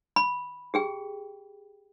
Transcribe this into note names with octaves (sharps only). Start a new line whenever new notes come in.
B5
G4 G#4 G5